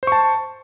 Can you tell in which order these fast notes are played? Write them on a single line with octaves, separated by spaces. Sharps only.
C5 C#6 A5